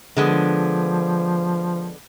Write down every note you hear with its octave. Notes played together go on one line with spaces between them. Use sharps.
D3 F3 G#3 B3